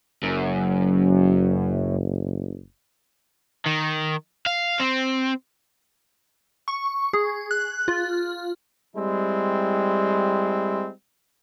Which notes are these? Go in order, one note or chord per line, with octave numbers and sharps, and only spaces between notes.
F#1 F#2
D#3
F5
C4
C#6
G#4
F#6
F4
G3 G#3 C4 E4